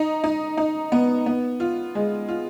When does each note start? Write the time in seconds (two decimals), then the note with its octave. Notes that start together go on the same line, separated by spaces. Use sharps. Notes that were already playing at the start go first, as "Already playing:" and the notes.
Already playing: D#4
0.24 D#4
0.57 D#4
0.92 B3
1.26 B3
1.60 F4
1.95 G#3
2.28 F4